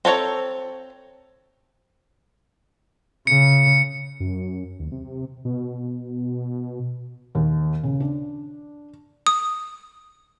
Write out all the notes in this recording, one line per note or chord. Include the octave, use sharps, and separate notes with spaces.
C4 A4 C#5 A#5
C#3 C#7
F#2
D#2
C3
B2
D#2
C#3
D4
D#6